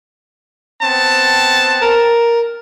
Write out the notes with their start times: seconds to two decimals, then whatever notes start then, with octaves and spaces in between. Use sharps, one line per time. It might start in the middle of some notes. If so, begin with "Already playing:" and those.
0.82 B3 C4 A5
1.82 A#4